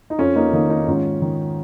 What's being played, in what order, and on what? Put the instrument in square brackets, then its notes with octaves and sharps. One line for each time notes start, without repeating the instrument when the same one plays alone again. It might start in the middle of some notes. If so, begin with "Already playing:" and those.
[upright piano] D#4
F2 C#4 F4
A#3 D#4
D#3 A#3 D#4
A#3 D#4
G#2 C#4 F4
D#3